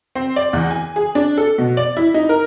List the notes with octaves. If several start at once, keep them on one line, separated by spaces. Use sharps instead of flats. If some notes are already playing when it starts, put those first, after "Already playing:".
C4
D5
E2
G#5
G#4
D4
A4
B2
D5
E4
D#4
A#4